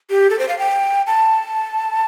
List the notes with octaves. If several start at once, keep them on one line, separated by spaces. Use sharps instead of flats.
G4
A4
C5
F5
G5
A5